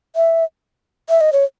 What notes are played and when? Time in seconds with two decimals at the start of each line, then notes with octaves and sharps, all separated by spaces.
0.16 E5
1.09 E5
1.21 D#5
1.33 C#5